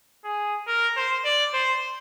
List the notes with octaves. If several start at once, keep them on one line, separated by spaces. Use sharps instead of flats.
G#4
A#4
C5
D5
C5